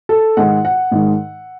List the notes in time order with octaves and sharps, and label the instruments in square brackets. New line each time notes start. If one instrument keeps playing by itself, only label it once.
[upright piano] A4
G#2 D#3 G#3 F#5
F#5
G#2 D#3 G#3